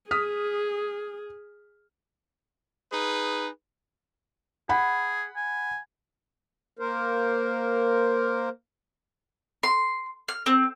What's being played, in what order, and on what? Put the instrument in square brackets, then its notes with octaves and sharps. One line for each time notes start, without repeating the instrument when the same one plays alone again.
[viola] G#4 [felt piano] D#6 F6 B6
[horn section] D#4 G#4 B4
[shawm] G#4 [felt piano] F#5 B5
[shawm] G#5
[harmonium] A#3 A#4 C5
[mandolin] C6
F6
C4